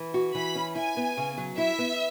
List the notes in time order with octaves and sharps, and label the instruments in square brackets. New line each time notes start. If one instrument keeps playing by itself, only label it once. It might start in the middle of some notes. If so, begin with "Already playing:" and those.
Already playing: [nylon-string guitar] E3
F#4
[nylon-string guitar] E3 [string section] B5
[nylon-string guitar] C#4
[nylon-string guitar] E4 [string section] G#5
[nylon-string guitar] B3
C#3
F#3
[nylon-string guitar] E4 [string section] E5
[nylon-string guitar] B3